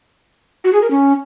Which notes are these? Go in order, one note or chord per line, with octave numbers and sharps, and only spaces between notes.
F#4
G#4
A#4
C#4